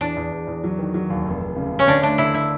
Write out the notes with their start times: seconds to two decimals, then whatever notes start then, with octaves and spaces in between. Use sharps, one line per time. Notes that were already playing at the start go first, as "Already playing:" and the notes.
0.01 E2 D4
0.17 E2
0.32 E2
0.47 E2
0.64 F#3
0.79 D#3
0.94 F#3
1.10 D#2
1.25 F1
1.41 F1
1.56 C#3
1.72 C#3
1.79 C#4
1.88 D3 D4
2.03 A3 D4
2.18 D3 E4
2.34 E4